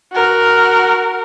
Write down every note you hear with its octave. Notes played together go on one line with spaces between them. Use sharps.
F#4 A#4